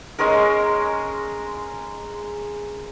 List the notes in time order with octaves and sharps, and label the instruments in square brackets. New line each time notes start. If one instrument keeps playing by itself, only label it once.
[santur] G#3 C#4 G#4 A#4